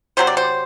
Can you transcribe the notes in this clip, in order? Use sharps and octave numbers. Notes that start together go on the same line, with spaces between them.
C3 F#3 C4 C5
D5
C5